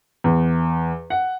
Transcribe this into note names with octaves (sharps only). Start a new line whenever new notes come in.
E2
F#5